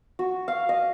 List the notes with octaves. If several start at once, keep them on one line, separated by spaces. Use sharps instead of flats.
F#4
F5
D#5